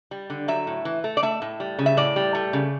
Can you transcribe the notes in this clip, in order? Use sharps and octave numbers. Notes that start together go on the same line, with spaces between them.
G3
D3
F#3 E5
A2
E3
A3
D5
A3 E5
A2
G3
C#3
E5
A2 D5
G3
A3
C#3